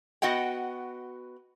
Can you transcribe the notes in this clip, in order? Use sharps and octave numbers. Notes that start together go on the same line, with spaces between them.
B3 F#4 D#5 F#5 G5